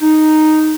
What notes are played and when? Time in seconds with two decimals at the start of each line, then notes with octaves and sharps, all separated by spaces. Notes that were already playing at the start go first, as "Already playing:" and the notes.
0.02 D#4